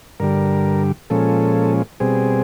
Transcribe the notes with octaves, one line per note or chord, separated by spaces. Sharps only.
G2 D3 G3 A#4
A#2 F3 G#3 C#4 A4
B2 G3 C4 G#4